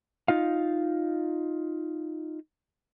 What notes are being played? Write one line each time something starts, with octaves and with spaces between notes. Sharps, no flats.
D#4 F4 F5